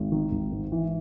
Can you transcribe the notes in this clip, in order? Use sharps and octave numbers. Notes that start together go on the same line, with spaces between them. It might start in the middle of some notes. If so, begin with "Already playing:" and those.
Already playing: G#1
D#3
G#1
G#2
E3